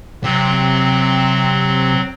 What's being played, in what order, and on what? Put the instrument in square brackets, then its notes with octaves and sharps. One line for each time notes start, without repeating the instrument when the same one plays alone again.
[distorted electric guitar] C3 [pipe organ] F#3 C4